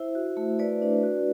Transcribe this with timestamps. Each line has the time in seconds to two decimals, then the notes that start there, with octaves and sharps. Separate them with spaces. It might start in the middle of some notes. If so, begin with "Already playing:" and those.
Already playing: E4 C5 E5
0.15 F#4
0.37 A3
0.59 A3 B4 D5
0.82 D4
1.03 F#4